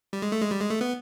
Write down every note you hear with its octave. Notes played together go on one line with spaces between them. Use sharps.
G3
G#3
A3
G#3
G3
G#3
A3
B3